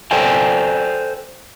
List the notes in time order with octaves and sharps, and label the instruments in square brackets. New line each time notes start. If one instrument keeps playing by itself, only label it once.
[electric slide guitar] A4 C5 D5 F5 G5 G#5